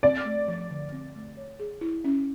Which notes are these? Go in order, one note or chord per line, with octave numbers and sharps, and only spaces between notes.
C4 D5
A3
F3
D3
C4
A3
C#5
G#4
E4
C#4